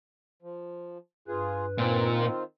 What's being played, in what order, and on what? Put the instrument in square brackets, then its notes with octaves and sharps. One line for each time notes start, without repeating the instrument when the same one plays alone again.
[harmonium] F3
[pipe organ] G2 B4 [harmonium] F4 G#4
[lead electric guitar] A#2 [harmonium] D#3 C4 F4